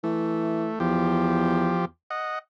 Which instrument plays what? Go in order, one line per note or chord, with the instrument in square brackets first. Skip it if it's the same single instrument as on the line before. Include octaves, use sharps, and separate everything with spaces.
[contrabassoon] E3 [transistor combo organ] A3
[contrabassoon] E2 [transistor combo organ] F3 G4
[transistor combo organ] D#5 F#5